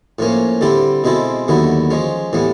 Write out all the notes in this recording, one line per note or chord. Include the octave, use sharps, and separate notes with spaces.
A2 F3 A#3 C#4
D3 G3 C4 E4 G4
B2 G#3 C4 E4 A4
D#2 D3 F#3 B3 E4
F3 G#3 C#4
A2 E3 G3 B3